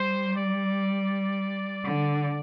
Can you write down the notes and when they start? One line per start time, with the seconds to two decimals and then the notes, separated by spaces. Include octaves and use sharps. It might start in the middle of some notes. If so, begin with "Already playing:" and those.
Already playing: G3 C5
0.36 D5
1.85 D3